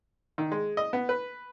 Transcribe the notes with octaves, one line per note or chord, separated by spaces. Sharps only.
D#3
G#3
D#5
B3
B4